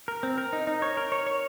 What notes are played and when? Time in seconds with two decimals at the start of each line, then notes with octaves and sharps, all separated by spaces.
0.08 A#4
0.23 C4
0.38 A#4
0.53 D#4
0.67 D#4
0.82 C#5
0.97 A#4
1.12 C#5
1.27 C#5